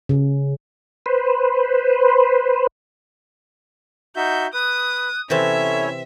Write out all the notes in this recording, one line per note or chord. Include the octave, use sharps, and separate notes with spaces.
C#3
B4 C5
D#4 F#4 E5 G6
B4 D#6 F#6
C3 E3 C4 C#4 E4 A4 C#5 E5